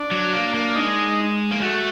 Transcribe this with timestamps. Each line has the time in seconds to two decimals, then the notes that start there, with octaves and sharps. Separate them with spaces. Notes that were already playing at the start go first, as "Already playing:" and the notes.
Already playing: D4
0.11 F#3
0.33 A#3
0.54 A#3
0.75 G#3 D#4
1.51 A#3
1.62 A3 F#4